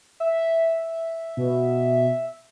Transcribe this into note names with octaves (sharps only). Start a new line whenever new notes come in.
E5
B2